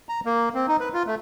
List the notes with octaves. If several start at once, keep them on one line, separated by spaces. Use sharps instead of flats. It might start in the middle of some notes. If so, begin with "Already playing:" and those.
A#5
A#3
C4
D#4
B4
F4
A3